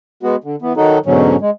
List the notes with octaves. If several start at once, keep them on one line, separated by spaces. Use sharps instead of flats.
G#3 B3 F#4
D3
E3 B3
D#3 F#3 D#4 F#4 A4
G#2 B2 D3 F#3 C#4
G#3